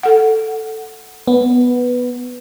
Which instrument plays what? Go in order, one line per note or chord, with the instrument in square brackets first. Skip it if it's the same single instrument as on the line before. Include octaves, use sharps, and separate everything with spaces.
[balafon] A4 F#5
[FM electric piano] B3